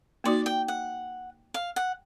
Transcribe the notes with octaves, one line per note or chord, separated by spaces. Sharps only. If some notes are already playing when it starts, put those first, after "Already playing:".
A#3 D#4 F#4 D5
G5
F#5
F5
F#5